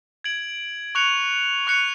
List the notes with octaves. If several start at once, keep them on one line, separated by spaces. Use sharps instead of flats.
G#6 D7 F#7
C#6 F#6 C#7 F7
C#6 F#6 C#7 F7